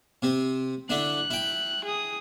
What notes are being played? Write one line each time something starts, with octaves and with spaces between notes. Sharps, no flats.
C3 C4
D3 D4 E4 F#6
E4 G5
G#4 D#6